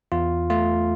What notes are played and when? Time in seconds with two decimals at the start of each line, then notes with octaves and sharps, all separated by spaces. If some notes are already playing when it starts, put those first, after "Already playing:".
0.12 E2 F4
0.50 A3 F4